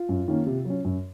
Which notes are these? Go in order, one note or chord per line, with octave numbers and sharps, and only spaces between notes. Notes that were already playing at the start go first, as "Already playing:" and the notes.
Already playing: F4
F#2
D#3 A#3 C#4
C3
F#3 C#4
F#2